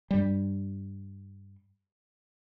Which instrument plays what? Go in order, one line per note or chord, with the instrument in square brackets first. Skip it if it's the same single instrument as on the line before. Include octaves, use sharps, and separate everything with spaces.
[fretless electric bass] G2 G3